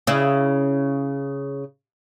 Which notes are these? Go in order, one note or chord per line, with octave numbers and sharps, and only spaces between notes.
C#3 E4